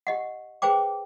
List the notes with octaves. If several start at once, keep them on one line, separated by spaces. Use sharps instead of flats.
G4 D#5 F#5
G#4 B4 C5 G5 D6